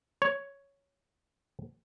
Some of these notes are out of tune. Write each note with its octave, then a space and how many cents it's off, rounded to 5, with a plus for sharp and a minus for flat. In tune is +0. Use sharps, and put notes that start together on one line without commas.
C#5 +5